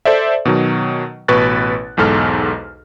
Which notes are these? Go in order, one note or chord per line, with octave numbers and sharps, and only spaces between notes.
A4 C5 D5 E5
B2 D#3 F#3
A1 B2 B4 C#6 F#6 A6
B1 E2 G#2 A4 F6